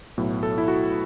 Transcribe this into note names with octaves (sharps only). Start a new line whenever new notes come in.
B1 A2 F#3 B3 E4
A4
E4
F#4